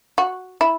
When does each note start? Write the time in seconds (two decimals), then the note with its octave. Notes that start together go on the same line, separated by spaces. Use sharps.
0.18 F#4
0.61 E4